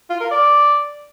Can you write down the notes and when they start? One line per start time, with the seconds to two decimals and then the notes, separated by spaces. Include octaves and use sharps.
0.10 F4
0.20 A#4
0.31 D5